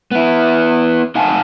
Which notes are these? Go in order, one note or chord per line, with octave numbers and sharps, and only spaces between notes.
B3 E4
D#4 F5 F#5 G#5 A5